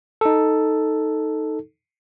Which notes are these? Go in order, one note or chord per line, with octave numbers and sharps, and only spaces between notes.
D#4 A4